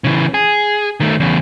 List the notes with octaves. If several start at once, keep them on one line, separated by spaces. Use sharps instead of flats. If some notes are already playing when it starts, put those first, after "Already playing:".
C#3 E3
G#4
D#3 A3
E2 C#3